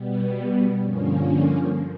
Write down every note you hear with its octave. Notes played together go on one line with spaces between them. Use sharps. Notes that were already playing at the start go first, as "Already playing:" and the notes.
Already playing: B2 G3 B3
G2 D3 F3 A#3 C#4